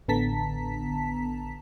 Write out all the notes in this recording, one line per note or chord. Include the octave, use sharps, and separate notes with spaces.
A1 D3 B3 A5 A#5 B6